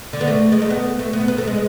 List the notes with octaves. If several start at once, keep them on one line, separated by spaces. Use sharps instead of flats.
D3
B3
A3
G#3
A3
B3
A3
B3
B3
A3
G#3